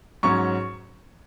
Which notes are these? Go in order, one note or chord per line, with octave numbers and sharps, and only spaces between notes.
G#2 F#3 C#4 C#6